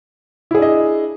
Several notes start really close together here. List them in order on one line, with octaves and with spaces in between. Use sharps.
E4 G#4 D4 D#5